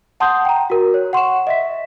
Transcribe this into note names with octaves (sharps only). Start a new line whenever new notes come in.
F#5 A5 C6 D#6 G6
G5 A#5
F#4 A#4
C#5
F#5 C6 C#6 E7
D#5 E5 B6